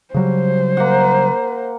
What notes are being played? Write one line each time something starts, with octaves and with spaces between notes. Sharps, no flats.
C#3 F#3 G3 C5
A#3 F#5